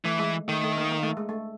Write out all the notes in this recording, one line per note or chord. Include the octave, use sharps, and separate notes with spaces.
E3 A3
G#3
D#3 A3
A3
A#3
A#3
A3
G#3
A3